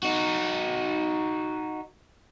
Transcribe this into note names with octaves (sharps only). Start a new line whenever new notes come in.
D#4 F#4